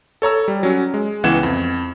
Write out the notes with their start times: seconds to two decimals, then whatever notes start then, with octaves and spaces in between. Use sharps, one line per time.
0.22 A4 C#5 A#5 E6
0.48 G3
0.63 F#3 C#4
0.94 G#3
1.24 C#2 E3 B3 F#5 G#6 E7
1.43 F2